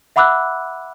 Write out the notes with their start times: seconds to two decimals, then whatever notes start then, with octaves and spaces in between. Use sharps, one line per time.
0.16 E5 F#5 B5 D6 E6 F#6